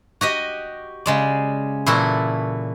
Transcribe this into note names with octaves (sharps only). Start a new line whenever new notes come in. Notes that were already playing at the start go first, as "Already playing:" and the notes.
F#4 G4 D#5
C#3 G#3 D5
A#2 E3 E4 F#4 A4